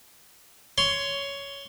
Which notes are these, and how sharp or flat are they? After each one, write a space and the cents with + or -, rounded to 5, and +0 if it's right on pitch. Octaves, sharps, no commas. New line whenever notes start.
C#5 +10 C6 +0